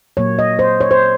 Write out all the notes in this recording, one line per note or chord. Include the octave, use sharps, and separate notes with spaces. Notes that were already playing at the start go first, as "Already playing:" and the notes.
A#2 F#3 A#3 C#5
D#5
C5
C#5
C5